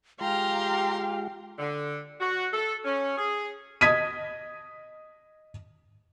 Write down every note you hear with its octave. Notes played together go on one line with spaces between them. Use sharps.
G#3 F4 G4 F5 G5 A#5 C6
D3
F#4
A4
C#4
G#4
D#5 D#6 G#6 B6 D#7